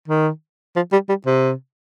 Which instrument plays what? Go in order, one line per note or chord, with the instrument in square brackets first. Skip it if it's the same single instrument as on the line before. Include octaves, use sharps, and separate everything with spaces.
[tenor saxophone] D#3
F3
G3
G3
C3